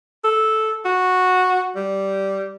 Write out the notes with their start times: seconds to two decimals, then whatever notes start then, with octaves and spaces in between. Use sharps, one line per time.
0.24 A4
0.85 F#4
1.76 G3